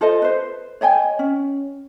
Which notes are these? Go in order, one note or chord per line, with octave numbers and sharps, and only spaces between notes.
F4 A4 C5 D#5
B4 C5
C#5 D#5 G5 G#5
C#4